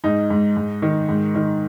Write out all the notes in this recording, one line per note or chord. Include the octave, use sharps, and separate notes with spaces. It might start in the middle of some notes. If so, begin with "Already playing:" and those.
G#2 D#4
G#2
G#2
D#3
G#2
D#3